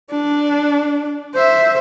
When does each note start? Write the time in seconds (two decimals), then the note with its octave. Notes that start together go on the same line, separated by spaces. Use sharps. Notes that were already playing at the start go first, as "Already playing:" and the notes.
0.11 D4
1.35 C5 E5